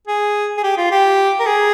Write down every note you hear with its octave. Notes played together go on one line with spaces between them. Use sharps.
G#4
G#4
G4
F4
G4
A#4
G#4